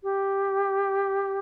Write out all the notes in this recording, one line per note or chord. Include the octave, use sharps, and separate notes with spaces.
G4